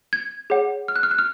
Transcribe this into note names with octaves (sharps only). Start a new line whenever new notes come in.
G#6
G#4 C#5 F#5
F6
F#6
F6
F#6
F6